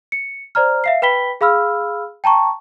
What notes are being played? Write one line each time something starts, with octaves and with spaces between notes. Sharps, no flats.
C#7
C5 D5 A#5 F6
E5 F5 C7
B4 G5 B5 B6 G7
G#4 F5 B5 E6 F6
G5 A5 A#5 C#6